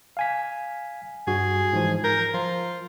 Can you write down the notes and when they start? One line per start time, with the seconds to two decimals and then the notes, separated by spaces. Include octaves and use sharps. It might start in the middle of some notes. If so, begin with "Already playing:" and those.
0.17 F5 G#5 B6
1.27 G2 F#4 G#4
1.73 G#2 E3 F3
2.04 A#4 G6
2.34 F3 F4